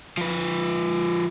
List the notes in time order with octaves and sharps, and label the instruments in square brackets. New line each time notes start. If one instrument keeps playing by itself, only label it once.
[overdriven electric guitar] F3 B4